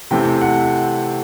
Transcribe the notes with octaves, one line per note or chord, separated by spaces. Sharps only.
C3 E3 A3 C4 G5
F#5